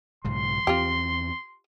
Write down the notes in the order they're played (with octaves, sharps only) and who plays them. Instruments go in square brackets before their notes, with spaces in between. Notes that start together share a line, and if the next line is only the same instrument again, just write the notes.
[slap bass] B1 G#2 C#3 [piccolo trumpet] C6
[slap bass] E2 C4 [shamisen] F4 G4